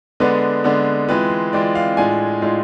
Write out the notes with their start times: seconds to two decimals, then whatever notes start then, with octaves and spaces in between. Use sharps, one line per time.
0.20 D3 G#3 B3 D4 B4
0.64 D3 G#3 B3 D4
1.08 E3 G#3 C4 F4 B4
1.53 E3 G#3 C4 F4 D5
1.75 F5
1.97 A2 G#3 D4 F4 G#5
2.42 A2 G#3 D4 F4